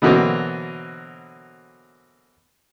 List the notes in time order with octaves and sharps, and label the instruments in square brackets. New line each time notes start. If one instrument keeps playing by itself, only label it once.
[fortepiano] B2 D3 E3 F#3 A#3 C4